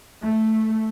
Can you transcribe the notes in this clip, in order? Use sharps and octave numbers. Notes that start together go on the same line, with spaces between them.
A3